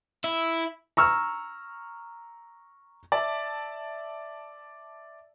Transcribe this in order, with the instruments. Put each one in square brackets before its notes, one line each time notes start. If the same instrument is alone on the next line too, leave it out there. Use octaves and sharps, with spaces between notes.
[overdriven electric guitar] E4 [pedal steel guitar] E5
[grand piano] A#5 C#6 E6 F6
D5 E5 A5